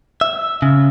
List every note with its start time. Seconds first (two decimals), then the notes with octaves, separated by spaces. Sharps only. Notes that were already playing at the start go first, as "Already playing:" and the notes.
0.21 E5
0.62 C#3